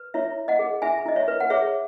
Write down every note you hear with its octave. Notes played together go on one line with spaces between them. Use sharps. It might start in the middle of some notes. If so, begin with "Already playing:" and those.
Already playing: B4
E4 C#5 E5
E4
D#5 F#5
G#4
E4 E5 G#5
E4 D#5
C#5 E5
B4
F#5
G#4 C#5 E5